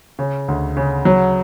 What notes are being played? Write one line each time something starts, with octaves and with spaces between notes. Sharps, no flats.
C#3
D2
C#3
F#3